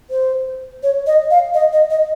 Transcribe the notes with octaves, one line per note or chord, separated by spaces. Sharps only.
C5
C#5
D#5
F5
D#5
D#5
D#5